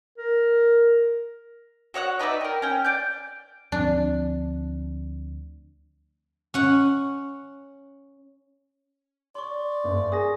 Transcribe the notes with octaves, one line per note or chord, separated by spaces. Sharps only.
A#4
F#4 C#5 D#5 F#5
D#4 B4 D5 E5
A#4 G5
C#4 G5
D5 G6
D2 F3 C4 D4
C#4 F#5
D5 C6 C#6
F#1
G#4 D#6 A#6